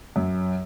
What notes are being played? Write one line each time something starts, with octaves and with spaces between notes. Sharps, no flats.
F#2